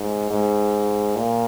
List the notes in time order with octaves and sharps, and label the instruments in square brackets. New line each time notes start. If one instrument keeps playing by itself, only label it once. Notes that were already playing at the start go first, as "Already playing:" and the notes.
Already playing: [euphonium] G#2
G#2
A#2